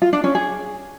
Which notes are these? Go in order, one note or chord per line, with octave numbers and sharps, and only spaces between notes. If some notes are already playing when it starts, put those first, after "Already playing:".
F4
D4
C#4
G#4